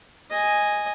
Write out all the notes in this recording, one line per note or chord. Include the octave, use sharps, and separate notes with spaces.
D#5 G#5